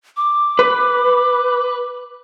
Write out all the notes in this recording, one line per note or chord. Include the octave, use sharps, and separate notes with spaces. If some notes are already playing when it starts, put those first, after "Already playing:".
D6
B4